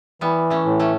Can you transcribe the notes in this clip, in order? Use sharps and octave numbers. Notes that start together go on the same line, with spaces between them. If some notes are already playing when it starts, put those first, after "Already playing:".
E3 G3 B3
A3 C#4
A2
A3 C#4